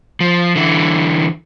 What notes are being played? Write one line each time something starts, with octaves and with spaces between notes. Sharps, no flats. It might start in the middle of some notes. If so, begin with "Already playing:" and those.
F3
D3 E3